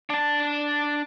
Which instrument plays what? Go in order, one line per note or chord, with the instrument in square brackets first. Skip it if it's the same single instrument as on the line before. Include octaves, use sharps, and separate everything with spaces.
[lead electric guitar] D4 A5